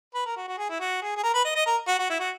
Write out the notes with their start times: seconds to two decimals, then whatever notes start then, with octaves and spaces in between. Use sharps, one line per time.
0.15 B4
0.26 A#4
0.37 F#4
0.48 F#4
0.58 G#4
0.70 E4
0.80 F#4
1.02 G#4
1.17 G#4
1.23 A#4
1.34 B4
1.45 D#5
1.56 D#5
1.66 A#4
1.88 F#4
1.99 F#4
2.10 E4
2.20 F#4